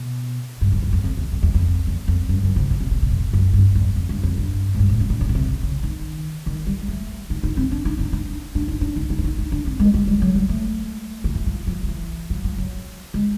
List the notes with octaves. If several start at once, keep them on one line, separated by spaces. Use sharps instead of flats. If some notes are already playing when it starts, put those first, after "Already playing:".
Already playing: B2
G2
F#2
E2
F2
F2
E2
F2
E2
F2
E2
F2
F#2
F#2
C3
C#3
C3
B2
B2
F2
F#2
G2
E2
F2
G2
F2
G2
G#2
G2
A2
C#3
D3
D3
B2
C3
C#3
D#3
D#3
G3
A3
D#4
D#4
C4
D4
D#4
D#4
D4
D4
D#4
D4
D#4
D#4
D4
D#4
D#4
D4
C4
G#3
G#3
G3
F#3
G#3
A3
D#3
E3
F3
F3
F3
E3
F3
F3
F#3
G#3